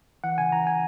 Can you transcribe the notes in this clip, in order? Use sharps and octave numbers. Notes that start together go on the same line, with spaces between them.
E3 F#5
C#3 G#5
E3 A#5
G#5